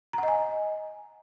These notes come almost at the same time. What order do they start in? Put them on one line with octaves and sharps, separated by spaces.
A#5 F#5 D#5 G#5